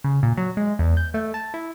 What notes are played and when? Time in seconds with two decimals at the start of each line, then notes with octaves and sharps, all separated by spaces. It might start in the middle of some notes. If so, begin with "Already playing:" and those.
0.04 C#3
0.23 A#2
0.38 F#3
0.57 G#3
0.79 E2
0.97 G6
1.14 A3
1.34 A5
1.54 E4